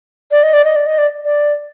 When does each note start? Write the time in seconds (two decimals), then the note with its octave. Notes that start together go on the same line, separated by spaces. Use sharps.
0.31 D5
0.43 D#5
0.54 D5
0.65 D#5
0.76 D5
0.86 D#5
0.98 D5
1.25 D5